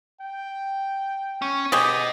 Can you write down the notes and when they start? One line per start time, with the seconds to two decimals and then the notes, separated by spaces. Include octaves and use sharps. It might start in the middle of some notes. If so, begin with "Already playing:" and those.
0.21 G5
1.42 C#4
1.72 G4 G#4 B4 D#5 G5